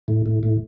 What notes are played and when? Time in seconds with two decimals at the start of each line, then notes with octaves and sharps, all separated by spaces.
0.08 A2
0.26 A2
0.43 A2